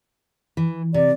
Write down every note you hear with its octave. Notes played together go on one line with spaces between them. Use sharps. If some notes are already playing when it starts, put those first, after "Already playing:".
E3
C3 D5